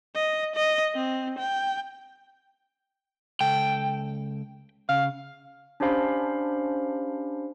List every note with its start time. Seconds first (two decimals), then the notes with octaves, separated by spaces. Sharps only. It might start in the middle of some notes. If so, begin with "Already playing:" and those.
0.15 D#5
0.56 D#5
0.95 C4
1.39 G5
3.41 C#2 A4 G5
4.89 C#3 F5
5.80 C#4 D4 G4 C5 F5 B5